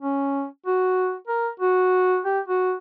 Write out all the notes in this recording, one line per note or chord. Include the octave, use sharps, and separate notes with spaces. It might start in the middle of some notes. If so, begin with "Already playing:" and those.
C#4
F#4
A#4
F#4
G4
F#4